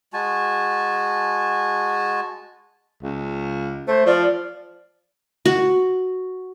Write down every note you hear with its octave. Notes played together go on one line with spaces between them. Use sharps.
G#3 F#4 G#5 A5
C#2
A3 C5
F3 D5
F#4